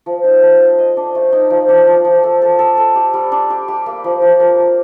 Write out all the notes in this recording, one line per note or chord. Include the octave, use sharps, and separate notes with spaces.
F3
D#4
A4
C5
D#5
D4
A3
D#4
F3
D4
F3
F3
A4
A4
A4
A4
G4
G3
D4
G4
G4
A#3
F3
F3
A#4
G4